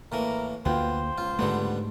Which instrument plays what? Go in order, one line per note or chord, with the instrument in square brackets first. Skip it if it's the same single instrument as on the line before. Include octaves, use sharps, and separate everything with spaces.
[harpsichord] A2 E3 A#3 [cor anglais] A#4
[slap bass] D2 A#3 [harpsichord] B3 [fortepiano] F4 F5 G5 [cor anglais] C5
[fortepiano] C#2 [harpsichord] F4
[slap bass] G#2 A3 [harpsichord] D3 G3 B3